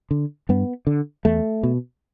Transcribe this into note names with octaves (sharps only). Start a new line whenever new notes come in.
D3
G2 B3
D3
E2 A3
B2